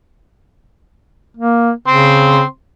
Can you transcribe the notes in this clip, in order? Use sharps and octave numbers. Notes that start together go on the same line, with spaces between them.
A#3
C#3 C4 C6